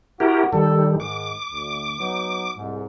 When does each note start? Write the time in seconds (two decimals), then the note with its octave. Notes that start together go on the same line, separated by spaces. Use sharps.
0.20 E4 F#4 G4 A#4
0.53 D#3 G3 A4
1.00 G#2 D#3 G#3 D6
1.53 D2
1.99 F#3 B3 D#4
2.56 C2 G#2